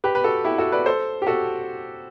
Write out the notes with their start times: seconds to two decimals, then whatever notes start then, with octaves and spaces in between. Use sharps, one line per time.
0.04 G4 B4
0.15 B4
0.24 F#4 A4
0.45 E4 G4
0.58 F#4 A4
0.72 B4 D5
0.86 A4 C5
1.22 G4
1.27 F#4 A4